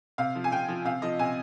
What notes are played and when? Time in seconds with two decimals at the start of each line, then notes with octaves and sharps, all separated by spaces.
0.18 C3 F5
0.35 F3
0.44 G#5
0.51 C3 G5
0.68 F3
0.85 C3 F5
1.02 F3 D#5
1.19 C3 G#5